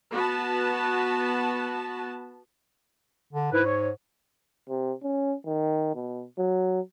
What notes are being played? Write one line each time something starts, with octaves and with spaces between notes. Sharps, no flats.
B3 F#4 B4 A5
D3
G#2 E4 B4
C#5
C3
C#4
D#3
B2
F#3